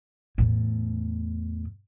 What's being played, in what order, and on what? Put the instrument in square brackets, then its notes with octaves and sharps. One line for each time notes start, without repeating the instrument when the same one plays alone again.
[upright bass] E2 A2